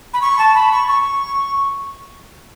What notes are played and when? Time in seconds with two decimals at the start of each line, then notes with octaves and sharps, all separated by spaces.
0.13 B5
0.22 C#6
0.39 A5
0.55 B5
0.72 C#6
0.88 C#6